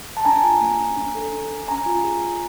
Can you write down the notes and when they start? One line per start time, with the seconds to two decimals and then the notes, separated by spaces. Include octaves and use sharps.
0.17 A5
0.25 D4 G#5 A#5
0.43 F4
0.61 A#3
0.79 D4
0.96 D4
1.15 A4
1.32 D4
1.50 D4
1.68 C#4 G#5 A#5
1.86 F4
2.04 G#4
2.21 F4